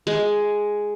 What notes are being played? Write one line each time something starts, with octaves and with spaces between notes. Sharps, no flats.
G#3